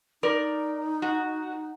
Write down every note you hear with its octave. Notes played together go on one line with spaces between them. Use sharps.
D#4 A#4 D5
F#4